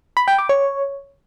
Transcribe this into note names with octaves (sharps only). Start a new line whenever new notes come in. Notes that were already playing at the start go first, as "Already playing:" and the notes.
B5
G5
D6
C#5